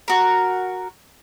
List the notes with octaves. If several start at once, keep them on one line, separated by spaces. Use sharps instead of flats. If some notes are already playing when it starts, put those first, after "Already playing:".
F#4 A#4